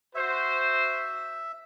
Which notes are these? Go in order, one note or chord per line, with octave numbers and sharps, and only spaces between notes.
F#4 C5 E5